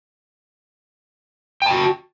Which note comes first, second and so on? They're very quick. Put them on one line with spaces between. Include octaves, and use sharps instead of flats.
G5 A5 F#4